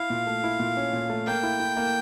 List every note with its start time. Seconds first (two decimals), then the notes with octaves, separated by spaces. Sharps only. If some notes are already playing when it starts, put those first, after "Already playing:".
Already playing: E4 F5
0.10 A#2
0.27 A3
0.44 E4
0.60 A#2
0.77 C#4
0.93 A#2
1.10 A3
1.27 A#3 G5
1.43 E4
1.60 E4
1.77 A#3